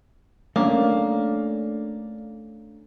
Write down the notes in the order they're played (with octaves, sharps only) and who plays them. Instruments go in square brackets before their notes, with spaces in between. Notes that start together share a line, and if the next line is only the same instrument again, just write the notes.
[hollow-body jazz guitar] A3 C#4 D4 [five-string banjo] A#3